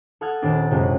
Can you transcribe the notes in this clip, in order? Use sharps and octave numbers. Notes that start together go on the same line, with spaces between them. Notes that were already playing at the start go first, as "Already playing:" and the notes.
A4 F#5 D#6 F6 G#6
D#1 C4 D4 A6
F#1 C3 G#3 C#4 F4 F#6